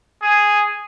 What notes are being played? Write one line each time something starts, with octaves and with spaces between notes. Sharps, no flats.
G#4